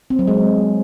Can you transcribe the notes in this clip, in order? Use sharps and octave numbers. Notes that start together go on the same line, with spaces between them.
C4
F#3
G#3